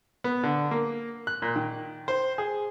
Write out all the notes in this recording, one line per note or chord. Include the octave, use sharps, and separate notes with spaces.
B3
D3
A#3
F#6
A#2
D#3
C5
G#4